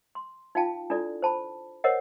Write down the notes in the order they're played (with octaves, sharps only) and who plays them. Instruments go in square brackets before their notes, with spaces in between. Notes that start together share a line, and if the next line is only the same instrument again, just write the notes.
[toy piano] C6
D#4 F4 F5 G5 A5
D4 E4 F4 A4 D5
C5 A5 B5
A#4 C5 C#5 D#5 F#5